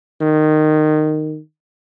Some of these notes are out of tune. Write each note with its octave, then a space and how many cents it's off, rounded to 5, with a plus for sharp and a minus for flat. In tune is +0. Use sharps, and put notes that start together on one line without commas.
D#3 -15